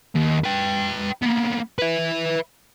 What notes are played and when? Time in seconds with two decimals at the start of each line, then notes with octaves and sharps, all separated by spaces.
0.15 D#2
0.44 B4 G5
1.22 A#3 B3
1.78 B4 E5